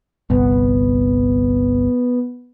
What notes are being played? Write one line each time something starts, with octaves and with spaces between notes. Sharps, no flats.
G1 C2 B3